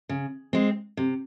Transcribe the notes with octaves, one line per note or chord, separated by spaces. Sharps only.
C#3
G#3 C4
C3